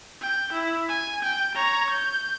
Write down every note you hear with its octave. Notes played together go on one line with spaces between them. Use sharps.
G5
E4
G#5
G5
C#5 A#5
G6